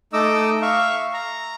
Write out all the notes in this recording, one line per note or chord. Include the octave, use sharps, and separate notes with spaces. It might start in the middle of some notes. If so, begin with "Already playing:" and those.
A3 D#4 D#5 D6 E6
E5 F5 C#6
A#5